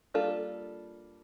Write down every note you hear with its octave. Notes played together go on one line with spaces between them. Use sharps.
G3 A#3 D4 F4 A4